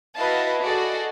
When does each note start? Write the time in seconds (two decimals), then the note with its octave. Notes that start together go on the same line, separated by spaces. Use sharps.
0.16 E4 F#4 B4 D#5 F5 A5
0.62 F#4 G#4 A4 D5 D#5